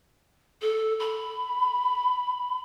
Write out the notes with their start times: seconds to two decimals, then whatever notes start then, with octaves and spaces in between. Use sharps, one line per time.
0.61 A4
1.00 B5